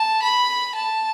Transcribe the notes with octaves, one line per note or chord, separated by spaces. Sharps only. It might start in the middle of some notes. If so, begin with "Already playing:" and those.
Already playing: A5
B5
A5